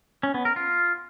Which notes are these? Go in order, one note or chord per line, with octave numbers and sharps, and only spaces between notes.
C#4
B3
A#4
F4